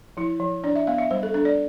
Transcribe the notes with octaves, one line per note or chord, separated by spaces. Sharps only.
F3 E4
F3
D4 D5
E5
B3 F5
E5
G3 C5
A4
D4 A4
D5